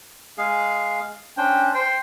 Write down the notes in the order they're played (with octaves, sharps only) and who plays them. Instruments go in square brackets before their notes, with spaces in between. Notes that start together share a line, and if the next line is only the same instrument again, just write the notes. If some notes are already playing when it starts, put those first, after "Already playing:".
[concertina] G#3 G#4 F5
[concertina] C#4 D4 C5 [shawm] G5
[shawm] C5 [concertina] G5